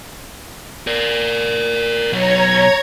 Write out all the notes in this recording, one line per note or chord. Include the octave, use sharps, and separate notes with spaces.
A#4 D5
B2 F#3 C#5 A#5 G#6